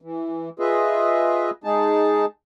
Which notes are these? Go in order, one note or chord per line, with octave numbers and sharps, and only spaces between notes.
E3
F4 G#4 B4 D#5 E5
G#3 D#4 G#4 A5